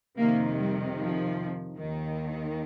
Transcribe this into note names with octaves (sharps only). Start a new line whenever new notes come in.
F2 C3 D#3 A#3
G3
F3
D#2 D#3